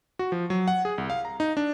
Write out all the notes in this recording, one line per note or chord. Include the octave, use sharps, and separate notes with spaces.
F#4
F3
F#3
F#5
G#4
C2
F5
A#5
D#4
D4